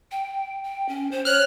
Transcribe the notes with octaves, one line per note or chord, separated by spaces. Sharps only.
G5
G5
C#4
C5
C#5 F6 F#6